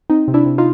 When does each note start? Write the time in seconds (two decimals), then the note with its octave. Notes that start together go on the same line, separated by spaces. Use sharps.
0.10 C4 D#4
0.28 C3
0.34 D4 E4
0.46 C3
0.58 D#4 F4